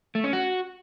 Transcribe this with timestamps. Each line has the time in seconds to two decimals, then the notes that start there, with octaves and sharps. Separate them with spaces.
0.15 A3
0.24 C#4
0.33 F#4